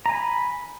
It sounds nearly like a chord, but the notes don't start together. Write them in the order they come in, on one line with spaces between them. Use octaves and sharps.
A#5 G#5 B5